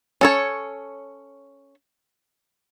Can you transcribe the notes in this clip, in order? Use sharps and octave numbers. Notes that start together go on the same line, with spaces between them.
C#4 A4 C#5